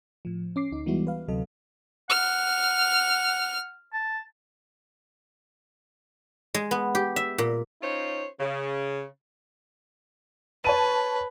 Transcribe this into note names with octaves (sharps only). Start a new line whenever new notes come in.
A2 F3
C#4 D6 C7
D2 D#4
E3 G3 G#3 B3 E4 F#4
B4 F5
D2 C3 F#3 A4 D#5
F#5 F6
A5
G#3
B3
G4
E5
A#2
C#4 D#4 F4 C5 C#5
C#3
B4 C#5 A5 D#7